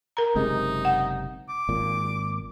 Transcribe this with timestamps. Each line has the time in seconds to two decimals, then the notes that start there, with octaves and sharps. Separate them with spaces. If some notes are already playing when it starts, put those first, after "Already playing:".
0.17 A#4 A#5
0.36 F#1 C3 G#3 D#4
0.85 F#5
1.49 D6
1.69 G#1 A#2